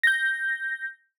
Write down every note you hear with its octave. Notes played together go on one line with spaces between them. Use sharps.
G6 A#6